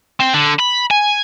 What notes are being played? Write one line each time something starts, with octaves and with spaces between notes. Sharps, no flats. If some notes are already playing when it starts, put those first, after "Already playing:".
C4
D3
B5
G#5